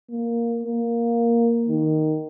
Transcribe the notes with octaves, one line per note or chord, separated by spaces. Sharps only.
A#3
A#3
D#3